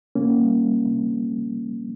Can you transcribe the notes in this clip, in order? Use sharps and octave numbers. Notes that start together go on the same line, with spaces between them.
C3 A#3 C#4
G3
G3
C3